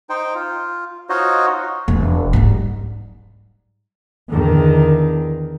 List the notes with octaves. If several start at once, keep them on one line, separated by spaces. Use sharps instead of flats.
D#4 C5 G5
F4
D#4 F4 F#4 C5 C#5 D#5
E1
G#2 G3
E2 D3 D#3